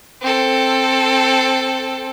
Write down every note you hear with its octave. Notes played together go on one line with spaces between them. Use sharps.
C4 A4